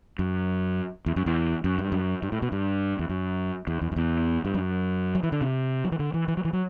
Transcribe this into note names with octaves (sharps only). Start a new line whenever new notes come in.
F#2
E2
F#2
E2
F#2
G2
F#2
G2
A2
B2
G2
E2
F#2
E2
E2
F#2
E2
G2
F#2
F#3
E3
D3
C3
F#3
E3
D3
E3
E3
F#3
E3
F#3